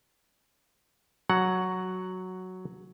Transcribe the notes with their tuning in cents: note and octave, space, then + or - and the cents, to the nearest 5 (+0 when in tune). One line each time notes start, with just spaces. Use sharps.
F#3 +0 F#5 +0